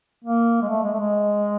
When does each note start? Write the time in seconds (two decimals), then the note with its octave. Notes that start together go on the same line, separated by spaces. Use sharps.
0.24 A#3
0.62 G#3
0.69 A3
0.83 G#3
0.93 A3
0.99 G#3